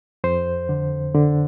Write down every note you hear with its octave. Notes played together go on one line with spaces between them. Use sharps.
F2 C5
D3
D3